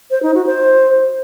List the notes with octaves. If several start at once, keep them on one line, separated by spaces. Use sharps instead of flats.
C5
D#4
F#4
C5